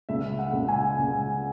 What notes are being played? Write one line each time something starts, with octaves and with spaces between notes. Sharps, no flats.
C#2 E5
F#5
C#2
G#5
C#2